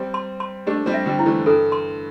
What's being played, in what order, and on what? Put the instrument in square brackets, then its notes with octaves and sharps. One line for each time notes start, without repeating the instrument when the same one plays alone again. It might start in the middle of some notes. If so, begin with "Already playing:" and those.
Already playing: [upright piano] G3 C4
[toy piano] C6
C6
[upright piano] A3 D4 [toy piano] G4
[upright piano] G3 C4
[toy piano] E5
[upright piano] D3 G3
[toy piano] E4
[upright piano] E3 A3
[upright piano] G2 [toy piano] A4
[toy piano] C6